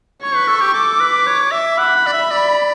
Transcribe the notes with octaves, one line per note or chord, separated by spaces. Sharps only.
C#5 C#6
B4
A4
G4
A4 D6
B4
C#5
E5
F#5 B5
F#5
D5
E5
D5